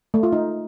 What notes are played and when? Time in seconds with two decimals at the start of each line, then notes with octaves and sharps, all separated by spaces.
0.14 A3
0.23 F4
0.32 D#4